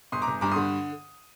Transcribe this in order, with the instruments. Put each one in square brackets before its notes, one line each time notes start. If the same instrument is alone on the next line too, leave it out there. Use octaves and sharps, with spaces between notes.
[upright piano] G1 C6 D#6
A#5 D6
G1
G2 A#5 D6
D3 C6 D#6